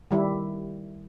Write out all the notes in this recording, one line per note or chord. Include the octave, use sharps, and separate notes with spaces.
D#3 G3 E4